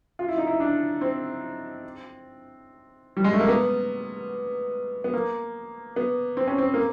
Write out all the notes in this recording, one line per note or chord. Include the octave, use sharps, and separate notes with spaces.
F4
E4
D#4
E4
D4
C4
G3
G#3
A3
A#3
B3
B3
A#3
B3
C4
C#4
C4
A#3